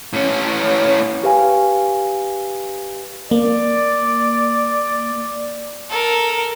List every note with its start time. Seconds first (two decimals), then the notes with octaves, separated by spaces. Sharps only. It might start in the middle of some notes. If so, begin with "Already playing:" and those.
0.13 A2 C#4
1.23 G4 B4 F5 G#5
3.31 A#3 D5
5.90 A4 A#4